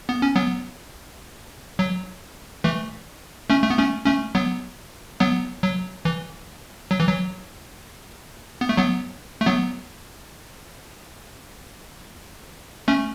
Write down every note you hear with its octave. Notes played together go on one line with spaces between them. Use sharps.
B3
C#4
F#3 B3
F#3
E3 A3
A3 C#4
A3
B3
A3 C#4
A3 C#4
F#3 B3
F#3 B3
F#3
E3
F#3
E3
F#3
B3
A3
F#3 B3
A3
F#3 B3
A3 C#4